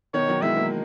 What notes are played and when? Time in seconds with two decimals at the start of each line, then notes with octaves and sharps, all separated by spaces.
0.14 B2 D#3 C#5
0.28 D#3 F#3
0.42 E3 G#3 E5
0.57 F#3 A#3